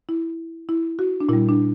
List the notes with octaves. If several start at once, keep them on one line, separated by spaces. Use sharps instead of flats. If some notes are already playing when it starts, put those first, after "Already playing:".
E4
E4
F#4
D4
A#2 G3 E4
D4